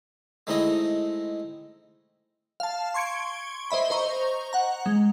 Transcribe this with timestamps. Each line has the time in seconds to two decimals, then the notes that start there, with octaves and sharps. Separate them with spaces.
0.47 G#3 A3 C4 D#4 E4 D#5
2.60 F5 A5
2.94 C6 C#6 G#6 C#7 D7
3.70 C5 D#5 E5 B5
3.90 C5 D#5 A#5 C#6
4.53 F#5 A#5
4.86 G#3